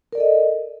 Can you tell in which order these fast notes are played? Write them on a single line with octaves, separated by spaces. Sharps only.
A#4 D5 A4 D#5